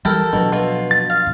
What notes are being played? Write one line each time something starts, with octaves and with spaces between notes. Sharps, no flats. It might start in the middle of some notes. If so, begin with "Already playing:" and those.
E3 G3 E4 G4 A4 A#4
B2 F3 F#3 D4
B2 F4
A6
F5